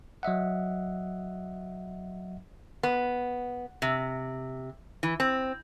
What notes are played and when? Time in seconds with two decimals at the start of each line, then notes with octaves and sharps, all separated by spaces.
0.23 F#3 D#5 E5 F#5
2.83 B3
3.82 C3
5.03 E3
5.20 C4